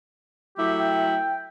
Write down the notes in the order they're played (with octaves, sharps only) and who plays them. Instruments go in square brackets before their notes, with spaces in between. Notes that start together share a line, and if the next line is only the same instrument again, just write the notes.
[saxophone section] F#3 A3 E4 [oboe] G4
[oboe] G5